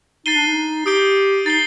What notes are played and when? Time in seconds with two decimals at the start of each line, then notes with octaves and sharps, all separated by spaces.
0.26 D#4 A6 C7 D#7 G7
0.36 D4
0.47 D#4
0.86 G4 D#6 G6 D7 G7
1.46 D#4 A6 C7 G7